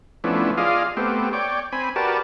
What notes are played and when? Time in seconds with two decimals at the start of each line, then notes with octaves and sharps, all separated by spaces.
0.24 F3 A3 B3 C#4 D4 E4
0.57 F4 G#4 D5 D#5 F5
0.97 A3 B3 C4 G4
1.33 C#5 D5 G5
1.72 C4 G#5 B5
1.96 F#4 G4 A#4 B4 D5 A5